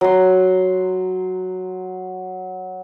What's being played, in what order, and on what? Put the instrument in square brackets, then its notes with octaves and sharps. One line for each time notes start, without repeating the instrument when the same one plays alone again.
[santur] F#3 C6